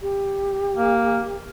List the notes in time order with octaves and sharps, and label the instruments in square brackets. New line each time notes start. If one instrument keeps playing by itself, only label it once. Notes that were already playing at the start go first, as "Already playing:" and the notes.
[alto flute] G4
[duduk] A#3